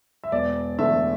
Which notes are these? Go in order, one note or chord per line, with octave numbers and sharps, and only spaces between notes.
E5
E1 D5
E2 D3 A3 D4 E5